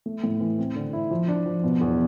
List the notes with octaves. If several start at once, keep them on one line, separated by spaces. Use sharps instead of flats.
A3
A2
E3
C4
D3
E4
F3
D4
F3
B2
E2